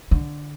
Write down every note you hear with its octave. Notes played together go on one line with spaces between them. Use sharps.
D3